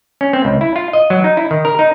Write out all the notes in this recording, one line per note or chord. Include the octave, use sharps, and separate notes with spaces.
C#4
C4
C#2
E4
F4
D#5
F#3
D#4
E4
D#3
A#4
D#4